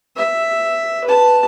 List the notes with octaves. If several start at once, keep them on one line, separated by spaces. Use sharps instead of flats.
E5
B4 A5